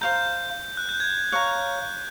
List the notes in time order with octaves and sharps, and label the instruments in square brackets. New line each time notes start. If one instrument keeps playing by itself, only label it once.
[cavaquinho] C5 F5 A#5 [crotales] G6
[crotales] F#6
G6
G#6
[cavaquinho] C#5 F5 A#5 [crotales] F#6